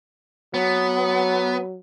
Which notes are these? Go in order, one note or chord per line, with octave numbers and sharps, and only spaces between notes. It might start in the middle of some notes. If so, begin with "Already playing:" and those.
F#3 B3